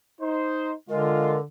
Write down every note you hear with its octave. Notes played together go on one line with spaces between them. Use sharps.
D#4 C5
D3 G#3 F4 A#4